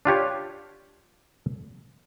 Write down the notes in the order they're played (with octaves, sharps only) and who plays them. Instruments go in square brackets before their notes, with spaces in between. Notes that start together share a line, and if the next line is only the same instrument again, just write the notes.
[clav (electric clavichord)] D4 F4 G4 C#5